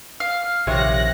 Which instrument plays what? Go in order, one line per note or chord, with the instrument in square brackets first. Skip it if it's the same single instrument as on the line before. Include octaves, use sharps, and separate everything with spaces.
[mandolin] F5
[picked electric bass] A#1 D#3 [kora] C3 C#5 [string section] F#6 A#6